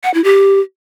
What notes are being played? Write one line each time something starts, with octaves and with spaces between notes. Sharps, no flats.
F#5
E4
G4